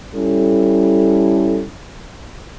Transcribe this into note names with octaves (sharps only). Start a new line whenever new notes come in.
G3 C#4 E4 A4